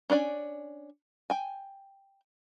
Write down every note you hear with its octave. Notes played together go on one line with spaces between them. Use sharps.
C#4 D4 D5 G#5
G5 G#5